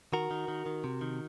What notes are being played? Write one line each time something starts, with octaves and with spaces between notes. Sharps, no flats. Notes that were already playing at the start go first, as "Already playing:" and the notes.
D#3 F#4 A#4
D#3
D#3
D#3
C3
D#3